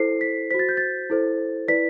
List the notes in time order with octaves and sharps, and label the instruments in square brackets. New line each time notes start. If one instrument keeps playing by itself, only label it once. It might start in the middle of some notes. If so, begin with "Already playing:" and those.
Already playing: [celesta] E4 A4 C5 C7
B6
F#4 C5 B6
A6
G6
A6
E4 A4 C5
E4 B4 D5 B6